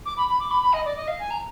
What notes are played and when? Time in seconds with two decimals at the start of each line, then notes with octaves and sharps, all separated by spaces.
0.05 D6
0.17 B5
0.28 B5
0.40 D6
0.51 B5
0.62 B5
0.73 D#5
0.85 D5
0.97 D#5
1.08 F5
1.19 G#5
1.30 A#5